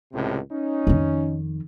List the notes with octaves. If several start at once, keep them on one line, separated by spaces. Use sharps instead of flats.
C#2 A2 C3
C#4 D#4
F2 D#3